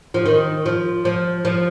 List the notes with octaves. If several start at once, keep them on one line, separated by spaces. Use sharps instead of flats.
F3
D#3
F3
F3
F3